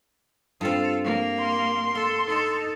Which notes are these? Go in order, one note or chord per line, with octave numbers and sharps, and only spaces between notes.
G2 C4 F4 A4
A#3
C6
A4 F5
D#4 A4